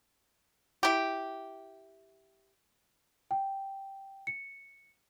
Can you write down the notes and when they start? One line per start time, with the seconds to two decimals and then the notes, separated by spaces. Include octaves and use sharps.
0.83 E4 G4
3.31 G5
4.27 C#7